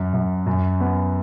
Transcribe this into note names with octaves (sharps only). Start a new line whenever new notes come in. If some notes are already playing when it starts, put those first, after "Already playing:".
Already playing: F#2
F#2
F#2
B3